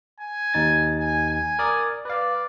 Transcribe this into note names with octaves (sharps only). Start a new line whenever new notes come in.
G#5
D#2 D#4 A6
G#5
G#5
A#4 D5 D#6
B4 D5 F5